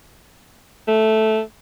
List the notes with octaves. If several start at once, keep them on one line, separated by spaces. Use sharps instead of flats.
A3